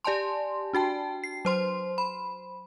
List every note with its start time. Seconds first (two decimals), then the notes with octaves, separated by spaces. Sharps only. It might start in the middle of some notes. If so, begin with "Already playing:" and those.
0.05 G4 D5 G#5 A5 C6
0.73 D4 F#4 G5 A5
1.24 C7
1.45 F#3 C5 C6
1.98 B5